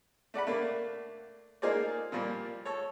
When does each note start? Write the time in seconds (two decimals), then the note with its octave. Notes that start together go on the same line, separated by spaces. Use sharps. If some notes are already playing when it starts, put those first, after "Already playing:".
0.34 A3 D5 F#5 B5
0.47 A3 A#3 D4
1.62 A#3 D#4 F4 G#4 C5 D5
2.12 A#2 F3 G3 A#3
2.65 A4 C#5